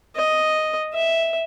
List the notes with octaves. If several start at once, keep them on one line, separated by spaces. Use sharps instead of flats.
D#5
E5